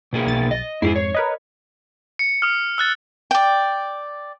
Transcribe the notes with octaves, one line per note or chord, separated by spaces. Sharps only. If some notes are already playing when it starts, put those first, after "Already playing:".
B2 A#3 G#4
B1 A6
D#5
F2 G#2 E4 G4 G#4 C7
C#5
A#4 B4 D#5
C#7
D#6 F6
E6 F#6 A6
D5 G5